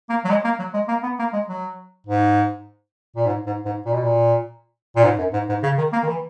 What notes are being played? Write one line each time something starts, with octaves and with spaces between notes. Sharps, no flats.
A#3
F#3
G#3
A#3
F#3
G#3
A#3
B3
A#3
G#3
F#3
G#2
A#2
G#2
G#2
G#2
A#2
B2
A#2
A#2
G#2
F#2
G#2
G#2
C#3
D#3
A#3
D#3
E3